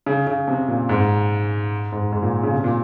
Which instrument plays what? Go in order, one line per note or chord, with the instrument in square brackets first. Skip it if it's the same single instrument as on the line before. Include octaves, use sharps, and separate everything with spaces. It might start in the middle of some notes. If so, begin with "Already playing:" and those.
[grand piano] C#3
C#3
C3
A#2
G#2
G#2
G#2
A#2
C#3
C3
A#2